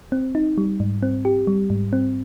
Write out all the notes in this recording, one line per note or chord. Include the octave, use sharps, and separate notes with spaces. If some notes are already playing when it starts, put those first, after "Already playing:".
C4
D#4
G3
G#2
C4
G4
G3
G#2
C4